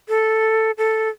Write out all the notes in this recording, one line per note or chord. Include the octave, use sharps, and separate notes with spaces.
A4
A4